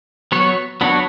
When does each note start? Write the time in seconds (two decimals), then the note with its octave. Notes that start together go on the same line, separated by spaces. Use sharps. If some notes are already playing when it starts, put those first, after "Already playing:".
0.32 F#3 B3 F#4 C#5
0.81 F#3 B3 D4 F#4 C#5